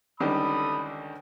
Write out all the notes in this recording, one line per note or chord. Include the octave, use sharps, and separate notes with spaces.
C#2 D3 D#3 G3 A4 B5 D#6